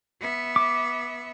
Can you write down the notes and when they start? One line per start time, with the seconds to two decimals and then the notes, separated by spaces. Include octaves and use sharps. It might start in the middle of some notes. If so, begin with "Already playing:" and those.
0.20 B3 E5
0.56 D6